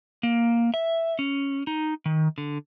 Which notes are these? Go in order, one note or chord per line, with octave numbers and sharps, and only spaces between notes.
A#3
E5
C#4
D#4
D#3
D3